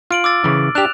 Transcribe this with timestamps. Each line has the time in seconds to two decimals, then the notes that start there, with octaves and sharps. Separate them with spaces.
0.11 F4 F6 D7 F#7
0.24 D6 E6 A6
0.44 C#3 E3
0.75 D4 G4 F#6 E7 F7